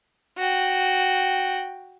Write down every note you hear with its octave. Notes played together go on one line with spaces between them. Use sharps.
F#4 G5